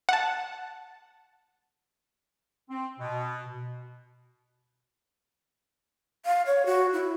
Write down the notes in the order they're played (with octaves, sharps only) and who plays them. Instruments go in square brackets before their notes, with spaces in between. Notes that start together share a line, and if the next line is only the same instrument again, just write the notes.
[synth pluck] F#5 A5
[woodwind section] C4
B2
[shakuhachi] F5
C#5
F#4
E4